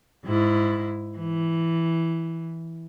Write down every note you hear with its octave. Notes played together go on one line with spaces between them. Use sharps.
G#2 E4
E3